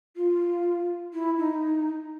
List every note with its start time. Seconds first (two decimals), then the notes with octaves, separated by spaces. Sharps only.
0.16 F4
1.13 E4
1.38 D#4